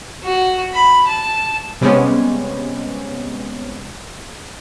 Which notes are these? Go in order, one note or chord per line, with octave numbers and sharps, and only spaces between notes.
F#4
B5
A5
C3 G3 G#3 B3 C#4